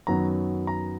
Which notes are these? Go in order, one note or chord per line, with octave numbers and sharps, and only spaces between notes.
F#2 D#3 F#3 B3 A#5
A#5